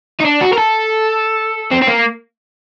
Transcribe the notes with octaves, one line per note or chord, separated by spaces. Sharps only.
D#4
D4
F#4
A#4
A4
C4
C4
A#3